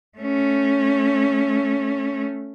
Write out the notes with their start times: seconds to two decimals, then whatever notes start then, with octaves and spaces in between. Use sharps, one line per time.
0.18 A3 C#4